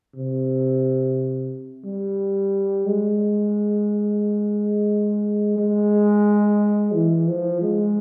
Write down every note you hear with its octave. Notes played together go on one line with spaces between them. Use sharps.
C3
G3
G#3
G#3
E3
F3
G#3